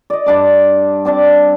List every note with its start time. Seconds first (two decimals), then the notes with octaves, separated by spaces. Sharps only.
0.10 D5 D#5
0.26 G2 D4 D6
1.05 C4 D4 D5 A5